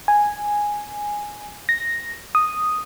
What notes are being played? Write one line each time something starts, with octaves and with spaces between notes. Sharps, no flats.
G#5
A#6
D#6